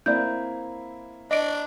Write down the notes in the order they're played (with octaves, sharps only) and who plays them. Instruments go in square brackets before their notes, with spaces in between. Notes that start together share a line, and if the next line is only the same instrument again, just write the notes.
[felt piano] A#3 C4 E4 [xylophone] D5 G6
[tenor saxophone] D4 [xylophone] D#5 D7